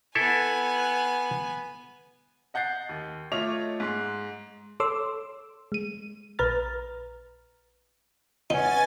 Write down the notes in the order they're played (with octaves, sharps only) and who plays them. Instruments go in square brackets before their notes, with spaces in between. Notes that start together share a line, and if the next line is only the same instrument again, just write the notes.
[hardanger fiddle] B3 G#5 [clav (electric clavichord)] E4 A4 E5
[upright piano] D#5 F#5 G6 A6 C7
D#2
A3 F4 C#5 D#5 D6 F7
G#2 C6
[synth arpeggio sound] A4 C#5 C6 D6 E6
G#3 D#7
A#1 B4 A#5 F6 A6
[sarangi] C#4 [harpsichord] D#4 [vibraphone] B4 F#5 [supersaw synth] G#5 A6